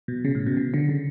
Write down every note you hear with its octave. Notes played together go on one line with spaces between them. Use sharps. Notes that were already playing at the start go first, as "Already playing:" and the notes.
B2
C#3
A2
B2
C#3
D3
C#3